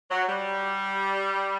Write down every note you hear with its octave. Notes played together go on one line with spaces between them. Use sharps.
F#3
G3